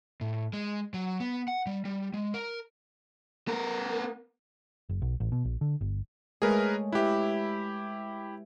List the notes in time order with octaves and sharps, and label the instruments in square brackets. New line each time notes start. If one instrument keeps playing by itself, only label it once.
[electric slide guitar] A2
G#3
F#3
B3
F#5
G3
G3
G#3
A#4
[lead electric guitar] B3 A#4
[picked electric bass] F#1
B1
A1
B2
A#1
D3
G1
[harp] G#3 A3 C#5 [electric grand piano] G#4 A#4 B4
[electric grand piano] E4 G4 [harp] B4 E5